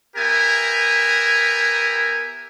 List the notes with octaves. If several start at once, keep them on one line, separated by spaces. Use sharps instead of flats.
B3 G4 A#4 E5 G#5